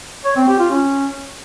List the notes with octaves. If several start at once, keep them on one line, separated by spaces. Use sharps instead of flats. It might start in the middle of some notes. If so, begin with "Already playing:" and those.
C#5
C4
G4
F4
C#4